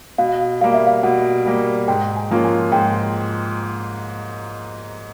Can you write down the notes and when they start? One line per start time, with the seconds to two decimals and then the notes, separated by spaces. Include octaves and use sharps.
0.18 B2 F5
0.61 G3 A#3 F5
0.74 E5
0.87 F5
1.03 B2 F#5
1.46 G3 A#3
1.88 G#2 G5
2.16 G#5
2.31 F3 A#3 C#4 F4
2.44 G#5
2.72 G#2 G5